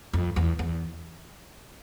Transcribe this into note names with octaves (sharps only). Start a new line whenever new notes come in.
F2
E2
E2